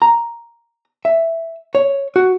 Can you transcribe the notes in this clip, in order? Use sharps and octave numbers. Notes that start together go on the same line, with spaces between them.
A#5
E5
C#5
F#4